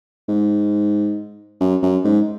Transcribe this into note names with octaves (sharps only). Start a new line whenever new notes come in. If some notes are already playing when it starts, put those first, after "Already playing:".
G#2
F#2
F#2
G#2